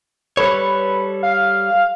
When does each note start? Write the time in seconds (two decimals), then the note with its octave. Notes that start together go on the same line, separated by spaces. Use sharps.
0.37 G3 A4 B4 C#5
1.23 F5